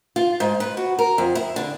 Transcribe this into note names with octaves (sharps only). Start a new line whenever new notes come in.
F4
G#2
B4
F#4
A#4
F2
E4
D3